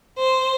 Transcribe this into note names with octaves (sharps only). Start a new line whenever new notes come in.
C5